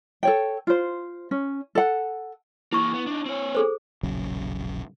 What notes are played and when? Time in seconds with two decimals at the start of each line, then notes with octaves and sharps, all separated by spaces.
0.23 A4 C#5 G5
0.67 F4 C5
1.31 C#4
1.75 A4 F#5
2.73 E3 A#3 E4 C#6
2.94 B3
3.07 D4 D#4
3.26 C4 C#5
3.55 G#4 A4 C5
4.03 E1 A#1 C#3 F#3